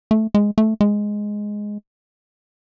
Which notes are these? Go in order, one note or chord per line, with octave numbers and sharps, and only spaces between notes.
A3
G#3
A3
G#3